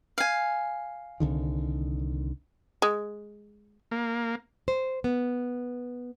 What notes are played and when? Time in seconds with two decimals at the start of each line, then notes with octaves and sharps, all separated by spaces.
0.18 F5 G#5
1.20 C2 D3 D#3
2.82 G#3
3.91 A#3
4.68 C5
5.04 B3